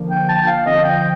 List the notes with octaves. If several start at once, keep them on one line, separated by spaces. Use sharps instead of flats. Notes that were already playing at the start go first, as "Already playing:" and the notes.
Already playing: D3 F3 A#3
G5
A5
G5
F5
D3 F3 C4 D#5
G5